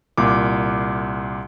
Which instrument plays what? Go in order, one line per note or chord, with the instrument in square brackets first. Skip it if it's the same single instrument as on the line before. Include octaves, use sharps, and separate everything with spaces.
[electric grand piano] C2 A#2 D6